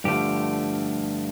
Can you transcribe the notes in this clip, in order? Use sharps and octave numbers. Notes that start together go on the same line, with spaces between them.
G2 D3 F3 A3 G4